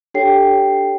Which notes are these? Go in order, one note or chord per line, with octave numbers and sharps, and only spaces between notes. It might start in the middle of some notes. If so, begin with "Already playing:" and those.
D4 G4 A4 C#5 G5 C7